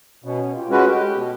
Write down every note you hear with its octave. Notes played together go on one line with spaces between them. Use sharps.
B2 B3 C#4
F4 G4
G#3 C#4 F#4 B4
G4 A4
B2